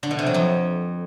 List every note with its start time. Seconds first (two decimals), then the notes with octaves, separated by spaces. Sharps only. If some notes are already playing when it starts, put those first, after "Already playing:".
0.03 D3
0.11 B2
0.19 C3
0.26 F#3
0.34 F2